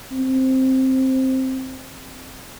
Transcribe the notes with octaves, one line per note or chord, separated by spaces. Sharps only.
C4